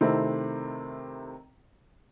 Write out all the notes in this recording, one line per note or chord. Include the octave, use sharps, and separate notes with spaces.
C3 D#3 A3 C4 E4